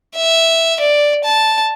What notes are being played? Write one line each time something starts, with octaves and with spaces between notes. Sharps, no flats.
E5
D5
A5